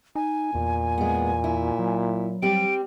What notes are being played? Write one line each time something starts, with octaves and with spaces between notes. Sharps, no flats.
D#4 G#5
E2 A#2
G#3 B3
E4
F#3
G3 C4 G4 D7